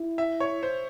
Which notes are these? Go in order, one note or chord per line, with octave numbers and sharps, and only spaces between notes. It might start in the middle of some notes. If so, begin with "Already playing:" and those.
Already playing: E4
E5
C#5
C5